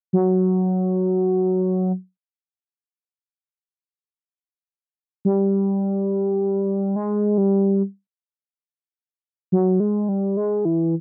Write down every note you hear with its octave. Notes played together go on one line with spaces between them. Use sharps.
F#3
G3
G#3
G3
F#3
G#3
G3
G#3
E3